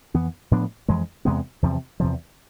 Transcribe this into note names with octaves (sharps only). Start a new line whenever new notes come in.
F2 E3 B3
A2 F3 B3 D4
F2 E3 G#3
E2 C3 G#3 B3
E2 C3 F3
E2 C3 F3